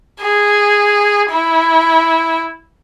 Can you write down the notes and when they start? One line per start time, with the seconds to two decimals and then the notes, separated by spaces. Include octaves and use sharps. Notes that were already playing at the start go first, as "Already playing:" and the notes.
0.21 G#4
1.31 E4